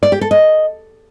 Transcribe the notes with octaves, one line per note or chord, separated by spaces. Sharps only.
D5
G4
A4
D#5